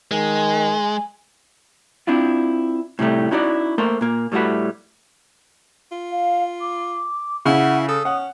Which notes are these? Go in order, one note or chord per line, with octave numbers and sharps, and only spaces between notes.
D#3 G#3 G#5
C4 D4 E4 F4
A2 C3 G3 A3
C#4 D#4 E4 F#4 A#4 D5
A3 A#3 A#4 C5
A#2 A#3
A2 G3 A3 F#4 B4
F4
F5
D6
C#3 E4 F#5
A4 D#6
C#4 F#5